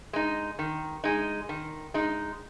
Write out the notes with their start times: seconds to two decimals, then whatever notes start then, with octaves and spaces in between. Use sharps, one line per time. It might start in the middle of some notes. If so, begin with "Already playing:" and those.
0.13 G#3 D#4
0.59 D#3
1.04 G#3 D#4
1.49 D#3
1.94 G#3 D#4